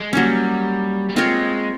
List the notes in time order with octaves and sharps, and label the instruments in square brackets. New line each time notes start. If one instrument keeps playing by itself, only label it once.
[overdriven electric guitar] G#3
[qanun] F#3 A#3 C#4 [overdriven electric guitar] G3
[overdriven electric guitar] G3
[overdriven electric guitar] G#3 [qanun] C4 F4 A#4 C#5